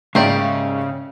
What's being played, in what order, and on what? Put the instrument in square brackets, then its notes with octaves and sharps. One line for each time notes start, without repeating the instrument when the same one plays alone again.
[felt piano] G#2 E5 C7 [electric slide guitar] C#3 [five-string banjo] A#3 G4 D5